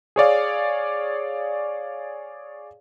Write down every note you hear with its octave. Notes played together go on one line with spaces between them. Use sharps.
G#4 C#5 D5 F5